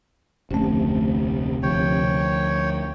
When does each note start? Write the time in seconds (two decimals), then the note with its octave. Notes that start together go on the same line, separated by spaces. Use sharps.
0.51 F1 D2 C3 A3 C#4
1.63 D2 F3 C#5 G5